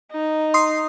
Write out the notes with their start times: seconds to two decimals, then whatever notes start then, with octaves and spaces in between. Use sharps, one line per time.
0.12 D#4
0.54 C6 D#6 C7